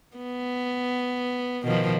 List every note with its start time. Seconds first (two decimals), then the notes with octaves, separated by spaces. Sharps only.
0.16 B3
1.64 B2 D#3 F3